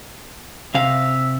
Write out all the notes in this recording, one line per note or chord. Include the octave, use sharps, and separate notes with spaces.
C3 E5 F5